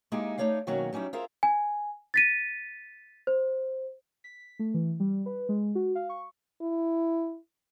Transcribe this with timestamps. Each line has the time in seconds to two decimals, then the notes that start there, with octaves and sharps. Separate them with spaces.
0.12 G#3 A#3 D#4 E4 G4 G#4
0.38 A3 D#4 C#5 D5 F5
0.67 B2 D#3 F#3 A#3 C#4 F#4
0.93 F#3 G3 C#4 D#4 E4
1.13 F4 G#4 A#4 C5 E5
1.43 G#5
2.14 A6 B6 D#7
3.27 C5
4.24 B6
4.59 A3
4.74 E3
5.00 G3
5.26 B4
5.49 G#3
5.75 F#4
5.95 F5
6.09 C#6
6.61 E4